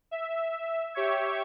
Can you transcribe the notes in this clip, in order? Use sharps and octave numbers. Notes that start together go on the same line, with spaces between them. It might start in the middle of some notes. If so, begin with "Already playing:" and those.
E5
G4 C#5 E5 C#6 G#6